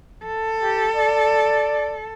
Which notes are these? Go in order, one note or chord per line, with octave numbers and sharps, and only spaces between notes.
A4
G4
D5